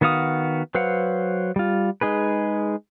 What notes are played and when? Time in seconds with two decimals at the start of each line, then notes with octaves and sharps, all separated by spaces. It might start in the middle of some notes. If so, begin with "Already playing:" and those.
0.01 D#3 B3 F#4 F5 D#6
0.75 F#3 B4 C5 F5 F#5
1.56 G3 F4
2.01 G#3 D#4 G#4 B4